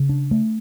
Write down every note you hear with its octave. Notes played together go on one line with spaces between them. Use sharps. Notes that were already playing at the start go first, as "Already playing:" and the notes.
Already playing: C#3
D4
A3